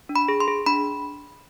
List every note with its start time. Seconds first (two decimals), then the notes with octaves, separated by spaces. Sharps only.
0.09 D4
0.16 B5
0.28 G#4
0.40 C6
0.48 G#4
0.66 D4 B5